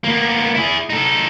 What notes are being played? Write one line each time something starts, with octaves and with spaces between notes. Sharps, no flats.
A#3 B3
E4 G#4
D#4 A4